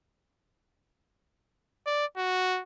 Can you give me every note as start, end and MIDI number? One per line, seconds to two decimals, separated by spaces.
1.86 2.05 74
2.17 2.61 66